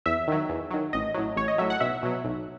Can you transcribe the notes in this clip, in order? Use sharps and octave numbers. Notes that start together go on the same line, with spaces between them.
E2 E5
D#3 F#3
E2
D#3 F#3
A1 D#5
A2 F#3
A1 C#5
D#5
A2 F#3 E5
F#5
B1 E5
B2 F#3
B1